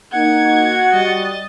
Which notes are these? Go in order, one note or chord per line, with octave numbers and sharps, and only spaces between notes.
A#3 D#4 F#5 G#6
F#4
G3 D#5 A6